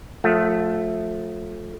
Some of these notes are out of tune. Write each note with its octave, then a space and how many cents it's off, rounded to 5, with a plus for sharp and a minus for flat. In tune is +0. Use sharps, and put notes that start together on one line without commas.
F3 +30 A3 +0